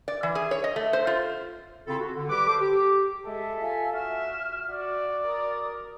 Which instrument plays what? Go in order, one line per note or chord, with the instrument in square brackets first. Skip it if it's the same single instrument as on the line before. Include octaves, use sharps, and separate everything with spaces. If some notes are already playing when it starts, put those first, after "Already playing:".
[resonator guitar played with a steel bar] D5
E3
G#4
C#5
D#5
A3
C5
F4
[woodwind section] C#3 C4 E4 F4 A4
F#4
D3
G3 G4 B4 D6
A4 C5 D6
G4
[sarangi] G#3 [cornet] A4 [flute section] E5
[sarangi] F4 [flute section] E5 F5 G#5
[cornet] F#4 [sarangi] E5 [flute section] F6
[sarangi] F#4 [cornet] D5
[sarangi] A#4 [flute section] D6 D#6